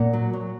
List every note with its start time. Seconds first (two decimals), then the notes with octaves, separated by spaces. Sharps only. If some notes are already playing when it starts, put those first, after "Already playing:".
Already playing: A#2 F#5
0.13 F#3
0.33 F#3